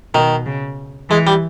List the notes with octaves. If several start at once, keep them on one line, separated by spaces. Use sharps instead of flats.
B2 D#3
C#3
E3 G#3
G3